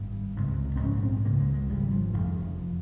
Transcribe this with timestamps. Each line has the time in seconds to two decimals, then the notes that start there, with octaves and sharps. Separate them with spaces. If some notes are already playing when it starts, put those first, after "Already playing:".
Already playing: G#1 G2
0.36 C#2 C3
0.76 C4
0.80 A#1 G#2 C#4
1.02 C4
1.24 C#2 C#3 A#3
1.40 G#3
1.54 G#3
1.70 G#1 G2 G3
1.91 F3
2.14 F1 F2 C#3 F3